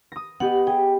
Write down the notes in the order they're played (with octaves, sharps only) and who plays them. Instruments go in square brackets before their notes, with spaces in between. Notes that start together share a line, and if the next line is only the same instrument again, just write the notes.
[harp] D#6 A#6
[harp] B3 G4 D#5 [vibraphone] F#5
[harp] G#4 [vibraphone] G5